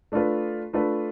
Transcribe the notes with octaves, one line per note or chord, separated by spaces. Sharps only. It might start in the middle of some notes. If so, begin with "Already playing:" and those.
A3 D4 F4 B4
A3 D4 F4 B4